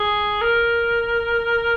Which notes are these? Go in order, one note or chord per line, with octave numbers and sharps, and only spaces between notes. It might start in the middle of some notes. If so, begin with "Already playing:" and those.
Already playing: G#4
A#4